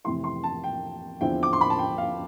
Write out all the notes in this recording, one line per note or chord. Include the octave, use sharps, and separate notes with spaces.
F2 C3 E3 A3 E4 C6
C6
A5
G5
E2 D3 F3 C4 E4 G5
D6
C6
B5
A5
G5
F5